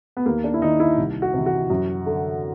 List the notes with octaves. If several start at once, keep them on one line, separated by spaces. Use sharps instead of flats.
B3
D#2 A#3
D4
E4
D#3 D#4
E4
C2
F#4
C3 E3
F#4
F#2
D3